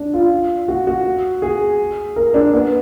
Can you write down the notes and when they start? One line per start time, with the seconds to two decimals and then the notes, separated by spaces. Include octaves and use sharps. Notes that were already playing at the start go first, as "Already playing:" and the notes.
Already playing: D4
0.13 F4
0.68 F#4
0.87 F#4
1.42 G#4
2.16 A#4
2.34 D4
2.53 B3